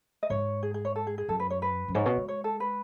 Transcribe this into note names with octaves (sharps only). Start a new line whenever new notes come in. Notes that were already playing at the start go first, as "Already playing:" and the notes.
D#5
G#2 C#5
G#4
G#4
C#5
A4
G#4
G#4
F#2 A4
B4
C#5
B4
F#2
G#2 C#5
B2
G#3
C#5
A4
B4